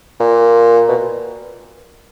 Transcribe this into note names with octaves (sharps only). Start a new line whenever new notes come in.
A#2
B2